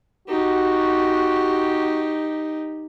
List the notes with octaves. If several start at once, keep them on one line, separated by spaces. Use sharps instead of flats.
D#4 F#4 G4